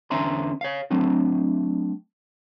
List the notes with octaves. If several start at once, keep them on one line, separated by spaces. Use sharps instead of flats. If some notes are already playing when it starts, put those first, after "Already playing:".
E2 D3 C#4 E5 A#5 C6
C#5 F5
F#3 A3 C4 D4